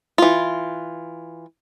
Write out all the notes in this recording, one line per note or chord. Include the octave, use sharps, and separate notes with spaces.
E3 F4